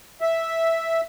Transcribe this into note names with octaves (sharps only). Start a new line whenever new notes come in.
E5